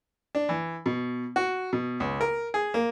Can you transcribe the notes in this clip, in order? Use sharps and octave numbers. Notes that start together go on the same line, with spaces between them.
D4
E3
B2
F#4
B2
C#2
A#4
G#4
A#3